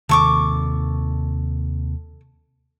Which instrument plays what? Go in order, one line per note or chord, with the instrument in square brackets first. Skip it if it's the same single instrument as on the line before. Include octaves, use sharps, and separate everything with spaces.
[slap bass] D#2 C3 D#3 [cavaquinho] A4 C#6 D6